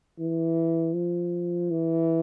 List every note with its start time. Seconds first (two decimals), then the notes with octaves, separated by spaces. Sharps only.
0.19 E3
0.94 F3
1.70 E3